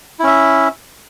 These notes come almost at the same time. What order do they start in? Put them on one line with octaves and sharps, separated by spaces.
E4 C#4 E5